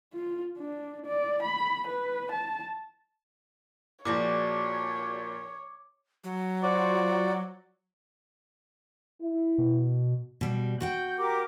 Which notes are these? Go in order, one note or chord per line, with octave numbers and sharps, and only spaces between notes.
F4
D4
D5
B5
B4
A5
A#2 F3 D4 F#4 G#4 C#5 D6
F#3
F4 F#4 C5 D5
E4
B2
B2 G3
F#4 F#5 G5 G6
G4 A#4 D6